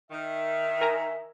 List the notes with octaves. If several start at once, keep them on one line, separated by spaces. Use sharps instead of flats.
D#3 E5
A#4 G#5 A#5